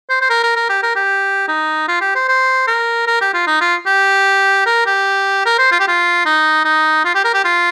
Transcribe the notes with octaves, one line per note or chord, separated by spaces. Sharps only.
C5
C5
A#4
A#4
A#4
G4
A#4
G4
D#4
F4
G4
C5
C5
A#4
A#4
G4
F4
D#4
F4
G4
A#4
G4
A#4
C5
F4
G4
F4
D#4
D#4
F4
G4
A#4
G4
F4